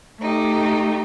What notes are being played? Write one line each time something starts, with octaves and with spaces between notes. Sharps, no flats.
A3 D#4 G4